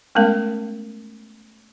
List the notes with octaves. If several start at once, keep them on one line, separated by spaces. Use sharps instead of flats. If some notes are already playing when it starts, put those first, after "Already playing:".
G#3 A3 B3 C#4 A#4